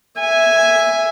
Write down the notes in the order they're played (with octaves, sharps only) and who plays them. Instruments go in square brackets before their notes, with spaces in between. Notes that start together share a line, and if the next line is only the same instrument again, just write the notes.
[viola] E5 G#5